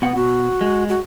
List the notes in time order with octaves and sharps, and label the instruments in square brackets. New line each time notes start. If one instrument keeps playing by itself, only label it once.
[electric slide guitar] B2 F#5 [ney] B3
[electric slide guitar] B2 [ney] F#4
[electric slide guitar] G#3
[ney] F#4